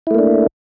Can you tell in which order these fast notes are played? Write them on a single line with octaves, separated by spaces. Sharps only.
E4 A3 A#3 D4